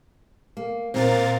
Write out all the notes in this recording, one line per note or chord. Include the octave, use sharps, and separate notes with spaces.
A#3
A#2 C4 F4 A#4 A6